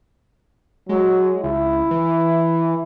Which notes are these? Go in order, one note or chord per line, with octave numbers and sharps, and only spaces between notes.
F#3 G#3
C#2 E4
E3